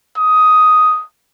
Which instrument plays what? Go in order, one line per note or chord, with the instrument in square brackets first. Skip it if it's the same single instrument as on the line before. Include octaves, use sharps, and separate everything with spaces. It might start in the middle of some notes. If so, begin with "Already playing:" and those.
[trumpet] D#6